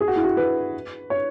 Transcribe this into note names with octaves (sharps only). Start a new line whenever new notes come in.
G#4
F#4
E4
F#4
B4
C#5